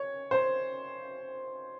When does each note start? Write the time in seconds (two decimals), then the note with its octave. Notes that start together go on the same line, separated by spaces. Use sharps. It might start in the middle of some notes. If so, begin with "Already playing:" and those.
Already playing: C#5
0.31 C5